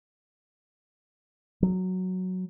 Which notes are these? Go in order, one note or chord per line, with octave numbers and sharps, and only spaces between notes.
F#3